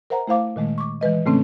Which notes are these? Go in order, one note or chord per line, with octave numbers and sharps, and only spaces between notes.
A#4 C5 E5 F#5 A#5
A3 E4 C5 F5 D6
A#2 D#3 G#3 A3
C#6 D6
E3 G#3 B4 D#5
A2 C#3 A3 C4 C#4